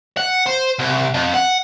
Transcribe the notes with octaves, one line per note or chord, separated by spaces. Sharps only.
F#5
C5
C2
F2
F#5